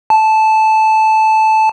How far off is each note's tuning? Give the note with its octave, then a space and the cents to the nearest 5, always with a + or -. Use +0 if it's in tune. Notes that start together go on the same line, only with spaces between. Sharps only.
A5 -10